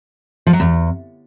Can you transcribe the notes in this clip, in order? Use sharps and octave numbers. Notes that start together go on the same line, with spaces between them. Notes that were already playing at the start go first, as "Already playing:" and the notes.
F3
F#3
E2